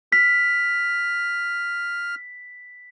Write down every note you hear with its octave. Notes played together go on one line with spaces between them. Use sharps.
F6 B6